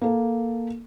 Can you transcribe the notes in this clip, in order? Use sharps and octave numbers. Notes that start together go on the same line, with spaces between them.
A#3 A4